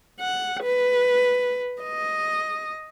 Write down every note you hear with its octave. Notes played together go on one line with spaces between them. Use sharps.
F#5
B4
D#5